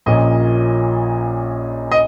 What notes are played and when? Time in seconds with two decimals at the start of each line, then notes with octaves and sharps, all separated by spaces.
0.06 A#1 A#2 F3 C#4 D#5
1.91 D#5